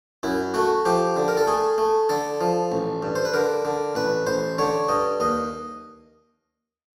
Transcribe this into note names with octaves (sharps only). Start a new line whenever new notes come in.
F#2 E4
A3 F#4
F3 G4
D3
A#4
A4
A3 G#4
A3
D3 A4
F3
A1
G2
C5
B4
D3 A#4
D3
A1 B4
A1 C5
D3 C#5
G2 D#5
D#2 D#5